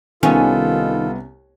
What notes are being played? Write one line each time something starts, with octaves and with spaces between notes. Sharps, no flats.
C2 D#3 B3 C#4 F4 A4